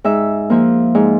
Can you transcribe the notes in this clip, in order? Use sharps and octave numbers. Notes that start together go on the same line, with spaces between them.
G#2 E5
F3 A#3
G#2